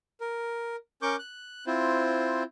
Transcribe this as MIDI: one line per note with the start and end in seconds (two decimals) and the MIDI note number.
0.21 0.76 70
1.02 1.16 61
1.02 1.16 70
1.02 1.16 85
1.02 1.16 86
1.02 1.16 91
1.19 1.65 90
1.66 2.43 60
1.66 2.43 64
1.66 2.43 65
1.66 2.43 72